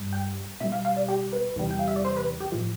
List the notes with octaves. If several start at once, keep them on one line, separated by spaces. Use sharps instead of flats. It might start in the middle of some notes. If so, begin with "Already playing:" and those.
Already playing: G2 G3
G5
B2 G3 E5
F5
F5
D5
G4
B4
E2 C3 E3 G3
G5
F5
E5
D5
C5
B4
G4
A2 F3 F4